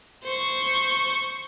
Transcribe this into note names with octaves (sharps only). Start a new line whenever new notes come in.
C5 C#6